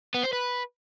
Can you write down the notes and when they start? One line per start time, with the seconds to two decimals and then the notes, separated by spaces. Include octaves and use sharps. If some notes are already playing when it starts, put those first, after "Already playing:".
0.14 B3
0.24 C5
0.33 B4